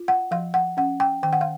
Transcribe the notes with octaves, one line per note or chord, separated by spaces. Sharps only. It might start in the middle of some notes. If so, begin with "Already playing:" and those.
Already playing: F4
F#5
F3 F5
F#5
C#4 F#5
G5
D#3 G5
F#5
F5